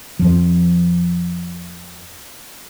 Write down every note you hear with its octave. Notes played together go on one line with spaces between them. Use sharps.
F2 F3